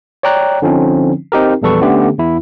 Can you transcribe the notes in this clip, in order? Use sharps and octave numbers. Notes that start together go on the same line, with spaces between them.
C#5 D5 G5 A#5 F#6
D3 F3 C4 C#4 D#4
C4 D#4 G4 A#4
A#1 E2 G3 A4 B4 C#6
D3 A3 B3 C#4 G4
E2 E4